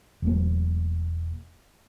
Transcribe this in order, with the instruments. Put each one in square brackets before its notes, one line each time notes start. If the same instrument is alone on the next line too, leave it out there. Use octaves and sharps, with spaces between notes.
[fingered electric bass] E1 F#3 A3 A#3